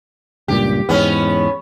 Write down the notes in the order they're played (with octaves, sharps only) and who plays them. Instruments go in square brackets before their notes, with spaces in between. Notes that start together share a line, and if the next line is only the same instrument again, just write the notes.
[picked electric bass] C#2 G2 A#2 [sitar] G4
[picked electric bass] E2 G#2 [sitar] B3 C#4